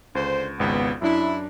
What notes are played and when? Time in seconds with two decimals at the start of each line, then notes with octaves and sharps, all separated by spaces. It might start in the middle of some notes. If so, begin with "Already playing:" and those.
0.15 C#2 D3 D4 C5
0.60 G#1 C#2 B3
1.02 F#2 D4 E4